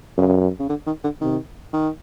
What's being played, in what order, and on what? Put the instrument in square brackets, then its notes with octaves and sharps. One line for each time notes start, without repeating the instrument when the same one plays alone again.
[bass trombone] F#2 [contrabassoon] C#3
[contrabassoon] C#3
D3
D#3
D3
[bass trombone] C3 [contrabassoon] D#3
[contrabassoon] D#3